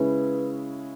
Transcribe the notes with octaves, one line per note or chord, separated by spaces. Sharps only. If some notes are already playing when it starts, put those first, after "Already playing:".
Already playing: C#3 G#3 C#4 E4 B4